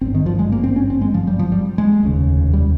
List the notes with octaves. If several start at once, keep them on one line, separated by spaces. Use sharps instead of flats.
G#1 G2 C4
D#3
F3
G#3
A#3
C4
C#4
C4
G#3
F3
G3
F3
G3
G#3
F1 D#2 C#3
G3